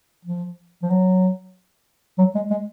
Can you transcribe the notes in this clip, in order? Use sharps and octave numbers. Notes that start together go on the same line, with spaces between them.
F3
F3
F#3
F#3
G#3
G#3